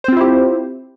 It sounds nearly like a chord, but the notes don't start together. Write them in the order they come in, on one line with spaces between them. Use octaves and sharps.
C5 C4 F4 E4 G4